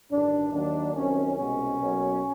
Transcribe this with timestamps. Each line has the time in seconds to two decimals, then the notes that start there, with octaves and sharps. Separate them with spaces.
0.10 A1 G2 D#3 D4
0.52 D#2 D#3 F#3 A#3 D4
0.95 C2 C3 D#3 F#3 C#4
1.36 C2 B2 G#3 C#4
1.79 B1 B2 F#3 A#3